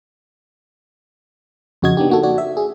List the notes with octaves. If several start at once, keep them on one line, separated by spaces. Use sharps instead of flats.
F2 C#3 F#4 D#5 G#6
B3 D4 D#4 G4
A#3 F#4 A4
F#4 D5
E5
G#4